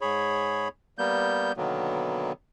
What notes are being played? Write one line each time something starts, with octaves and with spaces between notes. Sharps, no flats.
G#2 G#4 C#5 B5
G3 A#3 B3 G6
B2 D3 D#3 F#3 A#3 B3